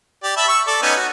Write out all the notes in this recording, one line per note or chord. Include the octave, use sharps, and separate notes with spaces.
G4 D5
E5 A5 B5
C#6 E6
A4 D5
B3 C#4 D#4
F#4